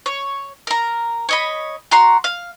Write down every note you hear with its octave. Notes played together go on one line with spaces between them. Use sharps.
C#5
A#4 A#5
C#5 D#5 B5
F#4 A#5 C6
F5